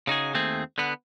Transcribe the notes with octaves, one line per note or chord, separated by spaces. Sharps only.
C#3 D#4 F#4 G#4
D#2 A3 C4 G#4
D3 B3